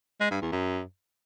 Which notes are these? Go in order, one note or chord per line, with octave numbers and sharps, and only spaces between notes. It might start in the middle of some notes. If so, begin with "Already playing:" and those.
G#3
G2
E2
F#2